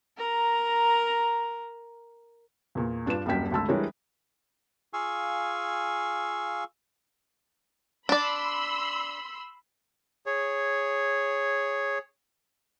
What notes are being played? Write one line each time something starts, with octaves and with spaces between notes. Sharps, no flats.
A#4 A#5
E2 A#2
G2 D4 F4 B4 E7
D#1 C2 F#2 G5 B6
G#1 D2 A5 E6
E3 G3 G#3 D4 A#4 C#5
F4 G#4 F5 G#5 C#6 E6
D4 D5 B5 C6 E6
G#4 C#5